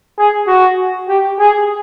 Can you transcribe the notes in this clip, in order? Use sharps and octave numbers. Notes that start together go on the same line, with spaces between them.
G#4
F#4
G4
G#4